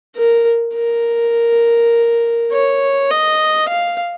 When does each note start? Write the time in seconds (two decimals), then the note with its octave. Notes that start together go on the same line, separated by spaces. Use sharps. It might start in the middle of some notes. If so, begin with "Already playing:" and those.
0.16 A#4
0.75 A#4
2.52 C#5
3.10 D#5
3.69 F5